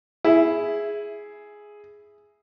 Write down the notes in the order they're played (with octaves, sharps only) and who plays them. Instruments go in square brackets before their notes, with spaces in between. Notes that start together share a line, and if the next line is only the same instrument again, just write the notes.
[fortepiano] E4 [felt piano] G#4